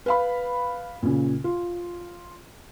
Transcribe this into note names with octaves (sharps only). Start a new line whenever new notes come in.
B4 F5 B5
A#2 C#3
F4